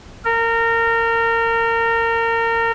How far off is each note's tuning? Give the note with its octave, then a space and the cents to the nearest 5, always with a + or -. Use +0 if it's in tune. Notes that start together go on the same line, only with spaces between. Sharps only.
A#4 -25